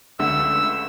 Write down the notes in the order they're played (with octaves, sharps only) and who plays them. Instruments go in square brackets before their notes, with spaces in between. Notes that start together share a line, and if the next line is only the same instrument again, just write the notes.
[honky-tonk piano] C#2 D3 A3 [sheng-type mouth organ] E6